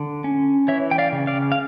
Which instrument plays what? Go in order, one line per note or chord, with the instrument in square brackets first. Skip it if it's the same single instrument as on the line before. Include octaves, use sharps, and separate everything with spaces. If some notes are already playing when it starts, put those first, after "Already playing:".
Already playing: [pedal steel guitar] D3
C#4
E3 C#5 E5
G5
D5 F5
C#3
D5 F5
F5